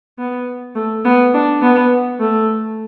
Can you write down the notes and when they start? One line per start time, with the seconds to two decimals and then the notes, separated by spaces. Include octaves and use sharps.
0.18 B3
0.76 A3
1.05 B3
1.34 D4
1.62 B3
2.20 A3